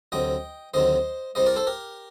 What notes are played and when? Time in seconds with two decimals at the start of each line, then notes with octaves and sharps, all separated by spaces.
0.12 D2 C3 F#3 D#5 G5
0.74 D2 C3 D#3 F#3 C5 D#5
1.35 C2 C3 G3 C5 D#5
1.46 A#4 D5
1.56 A4 C5
1.67 G4 A#4